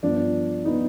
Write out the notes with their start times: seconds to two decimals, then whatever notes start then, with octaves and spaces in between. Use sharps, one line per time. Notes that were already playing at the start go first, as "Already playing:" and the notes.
0.03 G2 F3 B3 D4
0.65 F3 B3 D#4